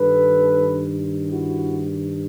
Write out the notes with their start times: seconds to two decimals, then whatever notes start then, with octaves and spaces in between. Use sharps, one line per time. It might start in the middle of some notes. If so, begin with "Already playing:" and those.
Already playing: G2 D#3 A4 B4
1.28 E4 F#4